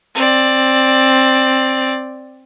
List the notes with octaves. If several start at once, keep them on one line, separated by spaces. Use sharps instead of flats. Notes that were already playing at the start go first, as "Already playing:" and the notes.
C4 D5